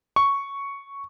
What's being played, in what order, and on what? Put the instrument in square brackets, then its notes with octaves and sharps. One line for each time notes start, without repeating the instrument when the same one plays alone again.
[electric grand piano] C#6